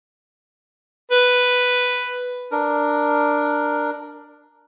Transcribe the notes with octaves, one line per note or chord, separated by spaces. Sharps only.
B4
D4 A#4